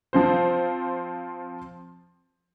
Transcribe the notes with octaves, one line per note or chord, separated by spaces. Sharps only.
F3 C4 C5